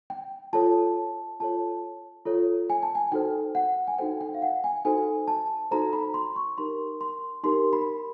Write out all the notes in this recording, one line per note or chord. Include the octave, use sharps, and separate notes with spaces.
G5
F4 A4 C#5 A5
F4 A4 C#5 A5
F4 A4 C#5
G#5
A5
G#5
D#4 F#4 A4 C5 G5
F#5
G#5
D#4 F#4 A4 C5 G5
G5
F5
F#5
G#5
D#4 F#4 A4 C5 G#5
A5
D#4 F#4 A4 C5 A#5
B5
C6
C#6
D#4 G4 A#4 C6
C6
D#4 G4 A#4 C6
B5